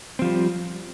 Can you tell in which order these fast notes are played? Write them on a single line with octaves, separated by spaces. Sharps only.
C4 F3 G3